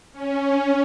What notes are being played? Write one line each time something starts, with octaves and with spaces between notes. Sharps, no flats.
C#4